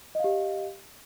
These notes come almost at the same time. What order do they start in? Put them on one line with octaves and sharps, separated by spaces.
D#5 F5 G4